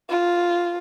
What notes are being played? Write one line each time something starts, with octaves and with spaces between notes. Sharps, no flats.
F4